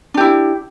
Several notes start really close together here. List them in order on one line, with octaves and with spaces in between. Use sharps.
D4 G4 E4